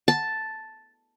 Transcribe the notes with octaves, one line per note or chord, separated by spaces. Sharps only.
A5